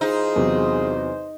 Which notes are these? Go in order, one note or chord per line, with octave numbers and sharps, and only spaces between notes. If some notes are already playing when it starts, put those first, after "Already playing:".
E3 D#4 F4 G#4 C5
E2 C3 F#3